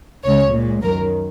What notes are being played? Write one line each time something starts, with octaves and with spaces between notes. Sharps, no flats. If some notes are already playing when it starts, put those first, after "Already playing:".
C#2 C#3 G#3 C#5
A#2 G#3
F#2 D#3 F#3 A#4